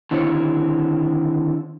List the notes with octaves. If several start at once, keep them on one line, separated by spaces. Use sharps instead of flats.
D3 D#3 C4 E4 G#4 C#5